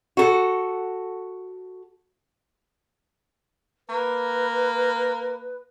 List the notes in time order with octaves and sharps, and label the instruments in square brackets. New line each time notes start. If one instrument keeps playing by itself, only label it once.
[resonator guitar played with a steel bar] F#4 A4
[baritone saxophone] A#3 [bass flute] B4